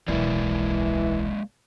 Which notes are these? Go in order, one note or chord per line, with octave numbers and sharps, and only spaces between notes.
D1 B1 E3 G#3 A#3 D5